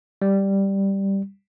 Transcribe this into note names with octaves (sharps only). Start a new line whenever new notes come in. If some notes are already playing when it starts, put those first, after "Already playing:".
G3